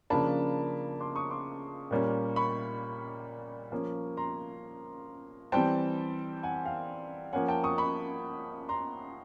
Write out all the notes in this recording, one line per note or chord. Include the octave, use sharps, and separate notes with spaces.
C#3 F3 A#3 D4 A5 B5
C6 D6
C#6 D#6
C6 D6
A#2 G3 A#3 C#4
B5 C#6
F3 A#3 C#4
A#5 C6
E3 G3 C4 G5 A5
F#5 G#5
F5 G5
F3 A#3 C#4 F#5 G#5
G5 A5
C#6 D#6
B5 C#6
A#5 C6